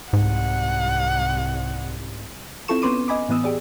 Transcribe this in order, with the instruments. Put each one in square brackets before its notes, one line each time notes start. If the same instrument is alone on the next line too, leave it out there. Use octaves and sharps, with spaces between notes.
[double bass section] C2 [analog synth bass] G#2 [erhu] F#5
[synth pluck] C4 E4 F4 A4 C#6 E7
B3 C#4 B4 C6 D6 D#7
D#5 G#5 B5 D6
A2 E3 B3 D#6 E6
G4 G#4 D5